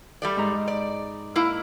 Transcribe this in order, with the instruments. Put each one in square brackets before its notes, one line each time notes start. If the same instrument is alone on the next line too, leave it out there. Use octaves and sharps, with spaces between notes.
[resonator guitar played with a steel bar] G3 A3 D5
[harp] G#2 G#3 A#5
[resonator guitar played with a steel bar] D5
A#3 E4